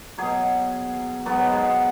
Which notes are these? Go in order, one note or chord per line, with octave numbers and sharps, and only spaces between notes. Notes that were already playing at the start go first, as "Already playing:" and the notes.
B2 F#3 G#4
G#2 F#3 B3
G#3